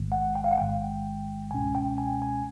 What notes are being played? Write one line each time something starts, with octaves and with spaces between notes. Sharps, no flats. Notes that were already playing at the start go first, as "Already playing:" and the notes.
Already playing: A1 G#2 D#3 G#3
F#5
G5
F5
F#5
A1 G#2 D#3 G#3 G5
C#2 B2 G#3 C#4 G#5
G5
G#5
G#5